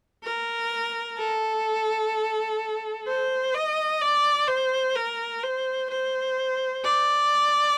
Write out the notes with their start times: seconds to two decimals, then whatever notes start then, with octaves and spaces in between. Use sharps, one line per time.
0.24 A#4
1.18 A4
3.07 C5
3.54 D#5
4.01 D5
4.48 C5
4.95 A#4
5.43 C5
5.90 C5
6.84 D5